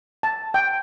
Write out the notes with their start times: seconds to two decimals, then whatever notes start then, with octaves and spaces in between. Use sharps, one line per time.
0.23 A5
0.54 G5